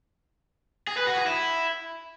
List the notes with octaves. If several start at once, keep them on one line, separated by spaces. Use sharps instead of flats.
G#4
B4
F#4
G#4
E4